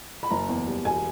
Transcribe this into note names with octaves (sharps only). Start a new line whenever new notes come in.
B5
F#1 A#5
E2
G3
E1 G#5